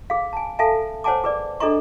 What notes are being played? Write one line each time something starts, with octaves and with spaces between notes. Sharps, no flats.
G#4 F5
G#5 A5
A4 E5 F5 G#5 A5
C5 C#5 F#5 G#5 A5 D6
G#4 B4 D5
D4 G#4 A4 D#5 A#5 C#6